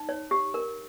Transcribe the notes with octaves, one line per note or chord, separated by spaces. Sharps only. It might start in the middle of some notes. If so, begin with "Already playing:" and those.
Already playing: D#4
C#5
G4
A#4